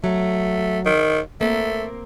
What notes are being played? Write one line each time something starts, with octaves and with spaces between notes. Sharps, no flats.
F#3 A3
D#3
A3 A#3 C4 A#4